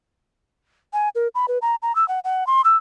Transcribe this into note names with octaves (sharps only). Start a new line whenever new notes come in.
G#5
A#4
B5
B4
A#5
A#5
E6
F#5
F#5
C6
E6